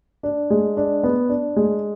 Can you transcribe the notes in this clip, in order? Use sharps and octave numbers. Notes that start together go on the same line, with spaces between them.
D4
G#3
D4
B3
D4
G#3